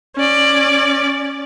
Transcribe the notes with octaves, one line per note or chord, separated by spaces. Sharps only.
C#4 D5